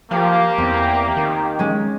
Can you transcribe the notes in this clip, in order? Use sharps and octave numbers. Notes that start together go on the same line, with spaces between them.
F3 A#3 G4 F5
E2 C4
D#3
G#3 C#4